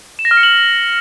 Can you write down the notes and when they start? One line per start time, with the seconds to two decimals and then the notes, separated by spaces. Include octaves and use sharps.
0.19 E7
0.25 A#6
0.31 F6
0.37 C#7
0.43 F#7